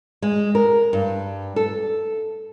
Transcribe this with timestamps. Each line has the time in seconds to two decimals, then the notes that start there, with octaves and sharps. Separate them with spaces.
0.22 G#3
0.55 A#4
0.93 G2
1.56 A4